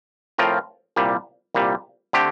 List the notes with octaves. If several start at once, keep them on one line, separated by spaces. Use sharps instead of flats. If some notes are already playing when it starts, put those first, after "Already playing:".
A2 F3 C4 F4 A#4
C2 A#2 G3
C2 A#2 G3
D3 A3 C4 G4